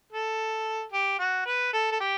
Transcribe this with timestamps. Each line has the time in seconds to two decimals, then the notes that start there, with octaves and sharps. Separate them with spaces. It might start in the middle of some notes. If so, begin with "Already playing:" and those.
0.13 A4
0.92 G4
1.19 F#4
1.46 B4
1.73 A4
1.92 A4
2.00 G4